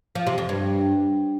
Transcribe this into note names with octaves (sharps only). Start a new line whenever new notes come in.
F3
C3
F2
G2